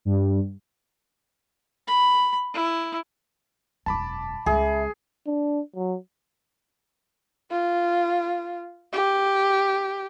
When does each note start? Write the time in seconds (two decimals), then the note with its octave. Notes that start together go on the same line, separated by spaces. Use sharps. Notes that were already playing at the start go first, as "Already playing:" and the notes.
0.05 G2
1.88 B5
2.54 E4
3.86 E1 F#2 A5 B5 D6
4.46 C#2 G#3 G#4 E5
5.27 D4
5.76 F#3
7.51 F4
8.93 G4